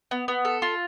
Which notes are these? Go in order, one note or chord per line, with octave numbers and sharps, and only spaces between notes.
B3
B3
A4
F4